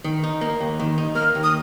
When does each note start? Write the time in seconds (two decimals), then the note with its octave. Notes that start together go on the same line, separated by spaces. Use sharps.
0.04 D#3
0.24 D#4
0.41 A#3
0.60 D#2
0.80 D#3
0.98 D#4
1.15 A#3 F6
1.35 D#2
1.43 D#6